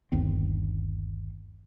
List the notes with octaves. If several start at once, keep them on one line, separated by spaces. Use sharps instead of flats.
G1 D#2 C4